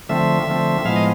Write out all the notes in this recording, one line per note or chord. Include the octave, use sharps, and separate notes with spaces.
D3 F3 A3 C4 E5
D3 F3 A3 C4
A2 F3 G#3 B3 F5
D#5